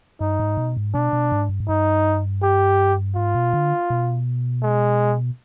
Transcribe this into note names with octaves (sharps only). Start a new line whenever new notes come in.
G2 D#4
G#2
B2
G#2
B2 D4
B2
G#2
G2
G#2
G2 D#4
G4
G#2 F4
B2
D3
B2
G#3